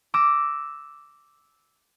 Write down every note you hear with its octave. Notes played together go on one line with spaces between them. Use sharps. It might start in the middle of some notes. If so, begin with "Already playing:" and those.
D6 E6 A#6